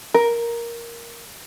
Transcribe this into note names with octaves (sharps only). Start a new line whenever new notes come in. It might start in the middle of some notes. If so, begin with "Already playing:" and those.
A#4